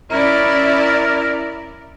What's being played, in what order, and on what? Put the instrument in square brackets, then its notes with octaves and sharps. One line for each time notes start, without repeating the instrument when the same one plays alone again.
[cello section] C#4 E4 D5 [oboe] A#4